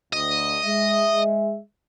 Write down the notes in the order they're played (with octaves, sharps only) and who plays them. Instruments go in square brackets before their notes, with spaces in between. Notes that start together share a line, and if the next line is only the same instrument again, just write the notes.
[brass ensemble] D2 [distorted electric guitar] D#5
[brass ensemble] G#3 E5